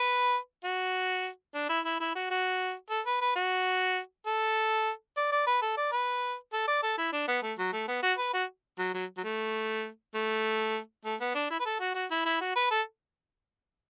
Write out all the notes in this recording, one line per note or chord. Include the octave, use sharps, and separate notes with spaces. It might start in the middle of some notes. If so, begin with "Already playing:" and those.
Already playing: B4
F#4
D4
E4
E4
E4
F#4
F#4
A4
B4
B4
F#4
A4
D5
D5
B4
A4
D5
B4
A4
D5
A4
E4
D4
B3
A3
F#3
A3
B3
F#4
B4
F#4
F#3
F#3
F#3
A3
A3
A3
B3
D4
E4
B4
A4
F#4
F#4
E4
E4
F#4
B4
A4